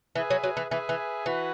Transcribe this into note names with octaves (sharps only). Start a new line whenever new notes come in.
E3 G#4 B4 E5 G#5
F#3
F#3
E3
E3 G#4 B4 E5 G#5
E3
E3 F#4 B4 F#5